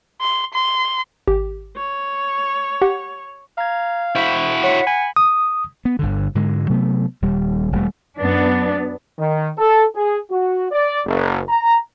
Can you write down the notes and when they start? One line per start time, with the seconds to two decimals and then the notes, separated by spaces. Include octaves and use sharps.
0.21 C6
0.54 C6
1.27 G#1 G4
1.77 C#5
2.82 G4 F#5
3.58 F5 A#5 G#6
4.15 E4 F#4 C5 B6
4.64 C#5 F#5 B6 C#7
4.87 G#5 B5
5.16 D#6
5.85 B3
5.99 G1 G2 D3
6.35 G#2 D3 G#3
6.70 C3 F#3 A3 B3
7.22 D#1 G3
7.72 D#1 G3 A3
8.20 F#2 B3 D4
9.19 D#3
9.58 A4
9.96 G#4
10.31 F#4
10.72 D5
11.06 F#1
11.49 A#5